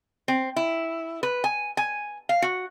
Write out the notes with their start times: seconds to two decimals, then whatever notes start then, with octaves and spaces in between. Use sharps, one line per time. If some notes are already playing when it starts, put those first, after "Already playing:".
0.28 C4
0.56 E4
1.23 B4
1.44 G#5
1.77 G#5
2.29 F5
2.42 F#4